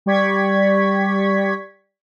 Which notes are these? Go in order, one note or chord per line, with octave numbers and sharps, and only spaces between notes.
G3 G4 D5 C#6 G#6 B6